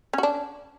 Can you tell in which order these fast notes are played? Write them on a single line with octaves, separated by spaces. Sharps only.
C#4 F#4 D4